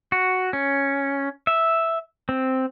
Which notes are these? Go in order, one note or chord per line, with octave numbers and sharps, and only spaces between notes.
F#4
C#4
E5
C4